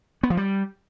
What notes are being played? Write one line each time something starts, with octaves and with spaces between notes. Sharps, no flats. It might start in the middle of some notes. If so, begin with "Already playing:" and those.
B3
F3
G3